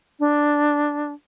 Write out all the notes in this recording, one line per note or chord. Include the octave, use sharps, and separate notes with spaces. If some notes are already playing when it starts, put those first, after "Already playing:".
D4